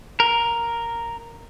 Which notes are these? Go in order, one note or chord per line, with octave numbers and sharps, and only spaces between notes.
A#4